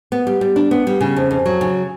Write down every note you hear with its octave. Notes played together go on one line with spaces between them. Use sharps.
B3
G3
G3
D4
B3
G3
C#3
F2
F2
F#3
C#3